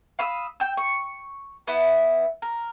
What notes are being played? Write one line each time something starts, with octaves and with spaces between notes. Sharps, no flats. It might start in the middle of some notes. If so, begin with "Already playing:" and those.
F5 B5 D#6 E6
G5 E6
C#6
B3 E4
A#4